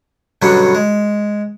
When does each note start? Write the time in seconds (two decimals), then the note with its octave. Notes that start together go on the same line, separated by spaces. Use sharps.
0.42 G2 B2 D3 F#3 C#4
0.75 G#3